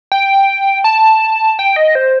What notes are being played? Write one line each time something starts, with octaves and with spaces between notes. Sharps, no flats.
G5
A5
G5
D#5
C5